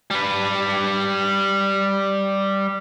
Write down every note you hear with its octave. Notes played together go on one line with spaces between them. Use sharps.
G3 B4